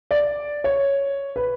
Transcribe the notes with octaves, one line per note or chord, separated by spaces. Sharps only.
D5
C#5
B4